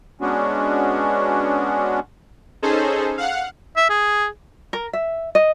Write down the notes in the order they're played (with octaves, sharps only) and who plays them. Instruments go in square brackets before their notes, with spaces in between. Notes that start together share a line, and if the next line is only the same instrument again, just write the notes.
[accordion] G#3 B3 C#4 D4 F#4
[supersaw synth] C#4 D#4 G#4 A4 C5
F5 F#5
[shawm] E5
G#4
[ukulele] A#4
E5
D#5